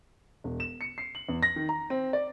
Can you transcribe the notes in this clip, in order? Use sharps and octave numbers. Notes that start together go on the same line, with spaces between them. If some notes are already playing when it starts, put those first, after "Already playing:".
E1
E7
C#7
C7
F#7
E2
A#6
D#3
A#5
C4
D5